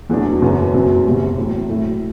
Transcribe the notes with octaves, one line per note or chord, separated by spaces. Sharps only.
E2 B2 F#3 A3 D4
F#1 F#2 F#3 B3
F#1 F#2 F#3 C4
F#1 E2 C3 G3
A2 F#3 A3 C4 E4
A2 F#3 A3 E4